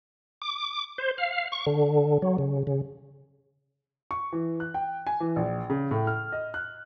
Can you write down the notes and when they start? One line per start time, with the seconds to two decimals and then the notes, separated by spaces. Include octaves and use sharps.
0.42 D6
0.98 C5
1.18 F5
1.52 C#6
1.66 D3
2.22 F#3
2.38 C#3
2.67 C#3
4.11 C#6
4.32 E3
4.60 F#6
4.74 G5
5.07 G#5
5.20 E3
5.36 A#1
5.70 C#3
5.91 A2
6.07 F6
6.32 D#5
6.54 F#6